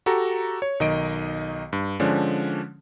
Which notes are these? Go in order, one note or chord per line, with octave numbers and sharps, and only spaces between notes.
F#4 G4 A4 A#5
C#5
B1 D#3 D#5 D7
G2
D3 F3 G#3 C#4 D4